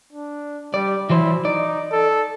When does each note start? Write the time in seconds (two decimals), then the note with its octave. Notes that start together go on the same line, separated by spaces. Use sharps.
0.12 D4
0.74 G3 D5
1.10 E3 F#3 E4 C5
1.45 D#4 D5
1.92 A4